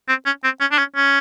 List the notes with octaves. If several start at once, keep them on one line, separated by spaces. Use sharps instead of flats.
C4
C#4
C4
C#4
D4
C#4
C#4